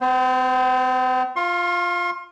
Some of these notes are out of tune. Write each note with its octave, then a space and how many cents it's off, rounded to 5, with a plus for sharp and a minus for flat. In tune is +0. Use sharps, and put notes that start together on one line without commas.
C4 -45 C5 +0
F4 +0 C6 +40